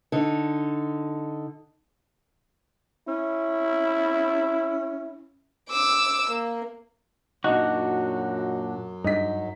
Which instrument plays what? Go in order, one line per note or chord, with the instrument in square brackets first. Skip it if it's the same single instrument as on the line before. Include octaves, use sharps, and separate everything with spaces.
[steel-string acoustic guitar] D3 D#4
[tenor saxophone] C#4 [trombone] E4
[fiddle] D6 E6
A#3
[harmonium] F#2 F#3 [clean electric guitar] A#2 D4 F#4 [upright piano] D#4
[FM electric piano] G2 [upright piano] D#4 B6